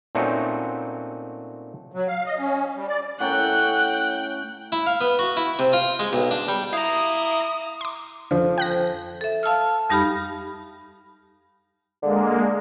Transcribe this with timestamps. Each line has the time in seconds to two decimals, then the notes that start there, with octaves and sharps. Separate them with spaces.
0.15 A#2 A3 C4 C#4 D#4 F#4
1.92 F#3
2.08 F5
2.26 D#5
2.39 C#4
2.75 G3
2.88 D5
3.20 A2 C#4 F#5 G5 A#5 F#6
4.72 E4
4.87 F5
5.01 B3
5.19 F#4
5.37 E4
5.59 C3
5.73 F4
5.99 G#3
6.13 B1
6.31 D4
6.48 G3
6.73 E4 F5 A#5 D#6
7.81 C6 D6
8.31 F2 D3 F3
8.58 G5 F#6 A#6
9.21 A4 E5
9.43 F5 A5 E6 F6
9.90 F2 G3 D#4 G4 B5 F6
12.02 D3 G#3 A#3